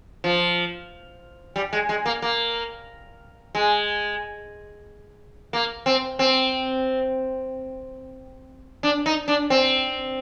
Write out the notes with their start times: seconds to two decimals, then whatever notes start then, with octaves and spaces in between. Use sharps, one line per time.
0.24 F3
1.56 G3
1.73 G#3
1.89 G#3
2.06 A#3
2.22 A#3
3.55 G#3
5.53 A#3
5.86 C4
6.19 C4
8.83 D4
9.06 D#4
9.28 D4
9.50 C4